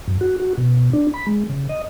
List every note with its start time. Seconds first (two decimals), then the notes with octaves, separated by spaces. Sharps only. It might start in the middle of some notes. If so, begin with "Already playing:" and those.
0.08 F#2
0.21 F#4
0.40 F#4
0.58 B2
0.93 D4
1.14 B5
1.27 G#3
1.49 C#3
1.69 D#5